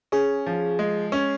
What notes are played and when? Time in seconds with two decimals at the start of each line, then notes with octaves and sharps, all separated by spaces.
0.12 C#4 G#4
0.46 F3
0.79 G#3
1.12 C#4